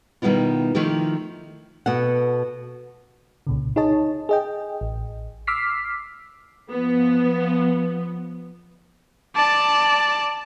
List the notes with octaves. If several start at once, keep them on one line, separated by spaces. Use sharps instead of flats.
B2 D#3 G3 B3 E4 F4
D#3 F3 A3 E4 G4
B2 A4 F#5
C2 A#2 C#3
D#4 G#4 C#5 D#5 A5
G#4 D#5 G5
A1
D6 E6 F6 B6 C7
F3 B3
D5 A5